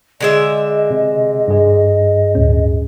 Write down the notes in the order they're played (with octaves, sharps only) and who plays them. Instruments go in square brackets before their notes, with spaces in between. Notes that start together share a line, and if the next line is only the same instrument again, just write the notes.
[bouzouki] D3 G#3 E5 [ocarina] D#5
[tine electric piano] C3
G2 G#4
[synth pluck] D2 A2 C#4